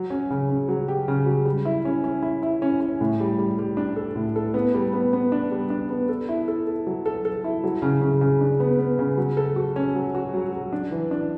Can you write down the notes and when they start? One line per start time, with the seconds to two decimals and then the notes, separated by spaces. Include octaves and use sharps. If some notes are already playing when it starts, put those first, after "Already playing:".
Already playing: F#3
0.10 C#4
0.30 C#3
0.49 C#3
0.69 F#3
0.88 G4
1.08 C#3
1.26 F#3
1.45 G3
1.65 E4
1.85 C#4
2.04 C#4
2.23 E4
2.43 E4
2.62 C#4
2.80 C#4
3.01 A2
3.20 G3
3.38 G3
3.59 G3
3.77 D4
3.96 A4
4.15 A2
4.36 A4
4.54 B3
4.74 G3
4.93 B3
5.13 B3
5.32 D4
5.52 G3
5.70 D4
5.90 B3
6.09 A4
6.29 E4
6.48 A4
6.67 A4
6.87 F#3
7.06 A4
7.25 A4
7.44 E4
7.64 F#3
7.82 C#3
8.01 C#3
8.21 C#3
8.41 D4
8.60 B3
8.79 B3
8.99 C#3
9.18 F#3
9.37 A4
9.56 F#4
9.76 C#4
9.95 F#3
10.15 F#4
10.34 F#3
10.53 F#3
10.73 D4
10.91 E3
11.11 D4